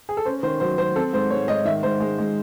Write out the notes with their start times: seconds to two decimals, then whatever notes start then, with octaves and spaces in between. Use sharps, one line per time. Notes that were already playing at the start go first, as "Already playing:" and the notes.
0.09 G#4
0.17 A4
0.25 C#4 C5
0.43 D#3 C5
0.60 F#3 C5
0.78 F#3 C5
0.96 C4 A4
1.13 G#2 C5
1.30 G#2 C#5
1.48 G#2 D#5
1.65 D#3 E5
1.83 G#2 C5
2.00 G#3
2.18 G#3